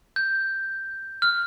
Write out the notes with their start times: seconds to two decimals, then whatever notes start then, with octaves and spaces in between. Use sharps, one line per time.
0.16 G6
1.22 F6